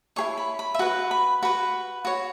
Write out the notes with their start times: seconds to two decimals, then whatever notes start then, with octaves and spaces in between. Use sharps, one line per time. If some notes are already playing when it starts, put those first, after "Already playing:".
0.16 E4 G#4 C#5 C#6
0.37 B5
0.59 B5
0.75 E5
0.79 F#4 B4 F#5
1.11 B5
1.43 F#4 B4 B5
2.05 F#4 C#5